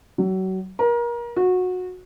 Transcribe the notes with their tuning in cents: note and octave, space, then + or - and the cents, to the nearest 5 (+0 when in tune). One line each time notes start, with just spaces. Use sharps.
F#3 +30
A#4 +30
F#4 -20